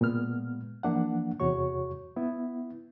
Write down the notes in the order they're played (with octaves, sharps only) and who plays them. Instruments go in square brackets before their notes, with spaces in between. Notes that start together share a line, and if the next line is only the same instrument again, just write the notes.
[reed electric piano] A#2 G#3 B3 F6
E3 F3 A#3 D4 F#5
E2 C3 F#4 C#5 C#6
B3 E4